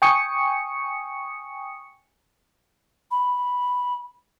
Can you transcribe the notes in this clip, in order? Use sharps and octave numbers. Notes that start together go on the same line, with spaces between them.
G5 G#5 C#6 D#6 C#7
B5